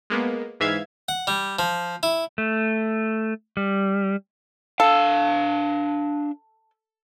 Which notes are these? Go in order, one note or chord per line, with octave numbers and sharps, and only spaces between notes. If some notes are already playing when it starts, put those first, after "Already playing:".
G#3 A#3 B3
G#2 E3 E5 F5 G#6
F#5
G3
F3
E4
A3
G3
D4 A4 F5